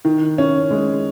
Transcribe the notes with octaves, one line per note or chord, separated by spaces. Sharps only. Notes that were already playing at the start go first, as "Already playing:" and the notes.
D#3
C#4
G#3